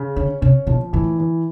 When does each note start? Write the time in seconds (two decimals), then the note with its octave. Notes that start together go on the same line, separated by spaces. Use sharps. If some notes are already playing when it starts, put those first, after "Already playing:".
Already playing: C#3
0.16 D3 C#4
0.42 C3 C#4
0.67 B2 F3
0.93 A2 E3
1.18 E3